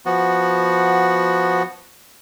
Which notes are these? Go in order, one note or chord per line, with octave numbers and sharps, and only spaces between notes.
F3 B3 F#4